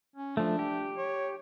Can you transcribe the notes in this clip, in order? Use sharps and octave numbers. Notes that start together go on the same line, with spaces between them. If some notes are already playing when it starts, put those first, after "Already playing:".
C#4
F3 A3 D4
G4
C#5